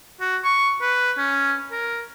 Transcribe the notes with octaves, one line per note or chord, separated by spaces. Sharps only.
F#4
C#6
B4
C#4
A#4